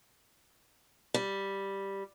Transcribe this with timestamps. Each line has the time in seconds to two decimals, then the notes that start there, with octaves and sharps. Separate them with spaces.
1.14 G3